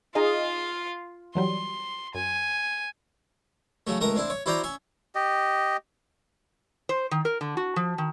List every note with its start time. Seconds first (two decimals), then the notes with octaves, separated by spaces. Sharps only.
0.15 D#4 F4 G#4 D#5 F5
1.35 E3 F#3 G3 C6
2.15 F#2 G#5
3.87 C#3 F#3 A3
4.01 C#2 A3 A#4 A#5
4.16 C4 D4 E4
4.30 C#5
4.46 E4 F#4 C5 D5 G5 A#5
4.63 C#4 E5
5.15 G4 D#5
6.89 C5
7.11 D#3
7.25 A#4
7.41 D3
7.57 F#4
7.76 F3
7.98 D#3